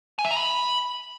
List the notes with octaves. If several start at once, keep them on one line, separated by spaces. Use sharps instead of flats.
G#5
E5
A#5
B5